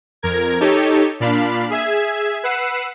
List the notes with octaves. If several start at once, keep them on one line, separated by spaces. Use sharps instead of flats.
F2 A#4 G#6
D#4 G4 A4 C#5
A#2 D4 F5 B5
G#4 E5 G#6
B4 F#5 E6 C7